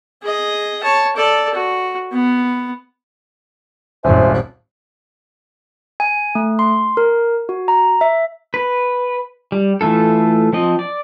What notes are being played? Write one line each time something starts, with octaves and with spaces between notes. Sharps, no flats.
G#4 D#5
C#5 A5
A4 D5
F#4
B3
D#1 G#1 C5 E5 G#5
G#5
A3
C6
A#4
F#4
A#5
E5
B4
G3
E3 A3 F4 A4
F3 C4 D#5
D5